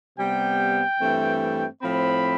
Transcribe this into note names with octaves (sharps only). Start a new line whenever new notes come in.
C3 G3 B3 G5
G2 E3 A3 C4
A2 F3 C4 B5